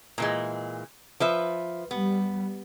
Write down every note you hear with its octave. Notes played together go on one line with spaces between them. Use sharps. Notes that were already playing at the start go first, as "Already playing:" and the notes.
A#2 E3 G#3
F3 B4 E5
G3 B3